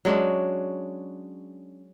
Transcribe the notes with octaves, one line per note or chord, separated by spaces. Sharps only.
F#3 G#3 C#4 D4